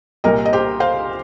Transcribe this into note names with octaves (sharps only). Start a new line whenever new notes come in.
C2 A#2 G3 A#4 D#5
D#5
G4 C5
C5 F5